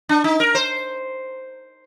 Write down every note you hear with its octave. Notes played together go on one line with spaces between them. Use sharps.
D4
D#4
A#4
C5